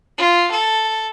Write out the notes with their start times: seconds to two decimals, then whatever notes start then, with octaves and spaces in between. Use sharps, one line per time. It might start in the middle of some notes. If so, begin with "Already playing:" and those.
0.18 F4
0.51 A4